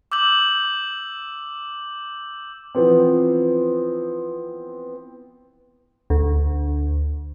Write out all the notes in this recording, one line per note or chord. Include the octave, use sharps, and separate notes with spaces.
D6 E6 G6 F#7
E3 F3 B3 C4
D2